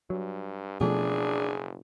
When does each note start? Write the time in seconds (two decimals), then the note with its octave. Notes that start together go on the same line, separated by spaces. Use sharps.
0.10 G2 F#3
0.81 F#1 B2 F3 A3 D4 G#4